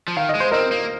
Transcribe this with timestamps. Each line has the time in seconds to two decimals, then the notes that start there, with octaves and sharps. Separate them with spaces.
0.08 F3
0.16 D#3 F5
0.29 D#5
0.35 G#3
0.40 C5
0.52 C4 A#4 D#5
0.71 A#3